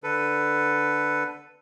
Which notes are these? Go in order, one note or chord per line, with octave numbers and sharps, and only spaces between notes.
D3 A4 B4